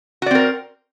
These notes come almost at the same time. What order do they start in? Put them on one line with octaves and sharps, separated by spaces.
F#4 D5 C4 A#4